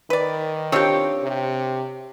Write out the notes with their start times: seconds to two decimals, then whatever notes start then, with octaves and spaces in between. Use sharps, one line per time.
0.10 D#3 B4 D5
0.72 C4 D4 F4 G4 C#5
1.23 C3